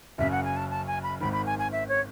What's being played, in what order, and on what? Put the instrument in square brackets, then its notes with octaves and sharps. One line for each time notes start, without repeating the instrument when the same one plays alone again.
[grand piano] F#1 F#2 C#3 [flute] E5
[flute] F#5
G#5
A5
A5
G#5
B5
[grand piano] G#1 G#2 D#3 [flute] B5
[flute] B5
G#5
G#5
E5
C#5